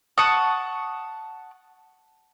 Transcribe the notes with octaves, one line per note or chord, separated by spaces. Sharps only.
F#5 A5 C#6 D#6